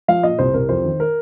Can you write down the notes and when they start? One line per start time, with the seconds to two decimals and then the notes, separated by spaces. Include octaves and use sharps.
0.08 F3 F5
0.23 A#2 D#5
0.39 C2 C5
0.54 C2 A#4
0.69 F2 C5
0.84 D#3
1.00 A#4